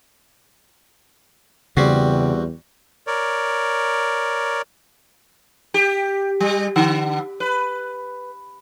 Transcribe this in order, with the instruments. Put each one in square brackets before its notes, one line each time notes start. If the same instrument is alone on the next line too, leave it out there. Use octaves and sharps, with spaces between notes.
[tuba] E2 [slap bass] C#3 [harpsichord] G3 C4 F#4
[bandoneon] A#4 C#5 D5
[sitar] G4
G3
D3
B4